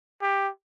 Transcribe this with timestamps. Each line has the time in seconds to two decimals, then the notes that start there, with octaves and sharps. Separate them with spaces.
0.22 G4